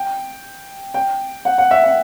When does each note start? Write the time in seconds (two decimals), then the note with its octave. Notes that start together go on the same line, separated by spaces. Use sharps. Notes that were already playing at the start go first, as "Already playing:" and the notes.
Already playing: G5
0.94 G5
1.45 F#5
1.58 F#5
1.71 E5
1.84 F#5